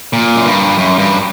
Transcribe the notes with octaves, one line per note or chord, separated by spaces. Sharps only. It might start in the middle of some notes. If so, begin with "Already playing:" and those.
A#2
F#2
G2
F#2
G2